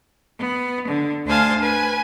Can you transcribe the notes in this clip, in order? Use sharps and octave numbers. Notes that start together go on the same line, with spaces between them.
B3
D3
D2 D4 C5 F5 G#5 A5
B4 G#5